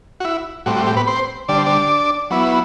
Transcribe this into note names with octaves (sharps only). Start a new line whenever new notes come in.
F#4
E4
A2 G3 C4 F#4
F#4
G3 G4
B3 B4
C4 C5
D3 G3 D4 D5
C5
D4 D5
F#3 B3 E4